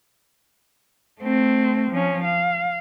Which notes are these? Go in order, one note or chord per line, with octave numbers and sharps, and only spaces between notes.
A3 C4
F3 C#4
F5